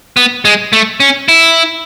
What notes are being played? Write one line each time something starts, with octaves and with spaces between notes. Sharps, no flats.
B3
G#3
A3
C#4
E4